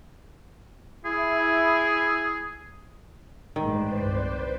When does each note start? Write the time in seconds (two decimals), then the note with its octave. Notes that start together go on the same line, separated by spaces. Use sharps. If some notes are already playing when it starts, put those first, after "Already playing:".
1.05 E4 G#4
3.56 A1 G2 D#3 G#3 B4 C5 D5
3.95 C2 G2